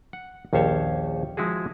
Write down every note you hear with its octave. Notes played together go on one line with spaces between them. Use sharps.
F#5
A#1 D#2 C#4 C5 C#5 A5
F3 G#3 E4 F#4 G#4